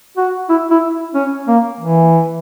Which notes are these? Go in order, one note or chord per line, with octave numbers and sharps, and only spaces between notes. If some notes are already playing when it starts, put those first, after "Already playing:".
F#4
E4
E4
C#4
A#3
E3